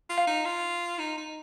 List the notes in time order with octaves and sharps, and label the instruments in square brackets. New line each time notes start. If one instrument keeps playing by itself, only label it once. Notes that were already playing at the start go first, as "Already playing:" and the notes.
[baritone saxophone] F4
[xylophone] F5
[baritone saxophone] D#4
F4
D#4
D#4